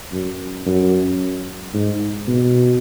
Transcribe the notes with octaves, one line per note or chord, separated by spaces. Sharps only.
F#2
F#2
G#2
B2